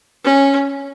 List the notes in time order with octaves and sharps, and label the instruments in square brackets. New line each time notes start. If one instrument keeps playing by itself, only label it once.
[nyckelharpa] C#4